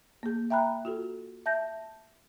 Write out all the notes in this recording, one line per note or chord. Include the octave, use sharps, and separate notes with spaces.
A#3 G#4
E5 G5 A#5 B5 F#6
F4 F#4 A4
E5 A5 G6 A#6